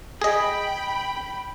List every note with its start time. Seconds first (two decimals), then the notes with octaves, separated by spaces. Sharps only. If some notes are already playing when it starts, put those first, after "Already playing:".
0.22 G#4 D#5 G5 B5